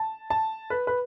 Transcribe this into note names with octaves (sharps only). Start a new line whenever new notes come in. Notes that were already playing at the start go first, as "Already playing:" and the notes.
Already playing: A5
A5
B4
B4